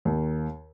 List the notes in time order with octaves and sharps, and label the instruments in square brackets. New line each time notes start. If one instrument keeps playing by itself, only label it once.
[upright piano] D#2